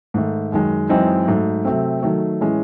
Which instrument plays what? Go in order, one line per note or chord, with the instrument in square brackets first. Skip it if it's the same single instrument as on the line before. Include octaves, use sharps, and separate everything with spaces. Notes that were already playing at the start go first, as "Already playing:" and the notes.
[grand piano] G#2 D#3 A3
F#2 D#3 G#3
F#2 E3 G#3 C4 D#4
G#2 F#3 A3
C3 F#3 A3 C4
D#3 F#3 A3
A2 E3 G#3 C#4